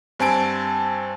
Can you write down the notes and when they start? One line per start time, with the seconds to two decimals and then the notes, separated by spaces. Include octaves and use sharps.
0.19 G2 C4 G#5 A5 D7